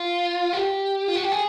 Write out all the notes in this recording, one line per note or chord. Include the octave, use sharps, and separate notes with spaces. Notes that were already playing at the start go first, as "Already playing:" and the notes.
Already playing: F4
F#4
G4
F4
F#4
G4
G#4